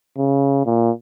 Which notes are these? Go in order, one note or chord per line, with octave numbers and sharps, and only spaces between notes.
C#3
A#2